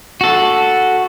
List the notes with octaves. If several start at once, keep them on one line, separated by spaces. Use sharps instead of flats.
F#4 A4